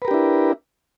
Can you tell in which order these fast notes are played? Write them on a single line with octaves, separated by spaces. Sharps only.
B4 A#4 G4 D4 E4